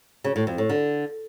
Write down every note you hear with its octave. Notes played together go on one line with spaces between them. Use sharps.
C#3
A2
F2
A2
D3